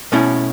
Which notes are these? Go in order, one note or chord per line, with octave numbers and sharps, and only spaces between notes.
B2 A3 C#4 E4